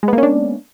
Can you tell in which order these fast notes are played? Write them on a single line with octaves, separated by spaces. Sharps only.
G#3 B3 A#3 C#4 D4